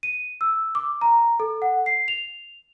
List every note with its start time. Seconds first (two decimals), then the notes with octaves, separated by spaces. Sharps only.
0.03 D#7
0.41 E6
0.75 D6
1.01 A#5
1.40 A4
1.62 F#5
1.86 C7
2.08 F7